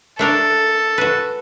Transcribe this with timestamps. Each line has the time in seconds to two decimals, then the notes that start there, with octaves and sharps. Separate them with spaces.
0.19 A3 D4 A4 A#4
0.98 F#4 B4